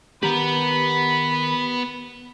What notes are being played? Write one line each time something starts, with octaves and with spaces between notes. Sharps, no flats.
D#3 B3 G4 B4 A#5 B5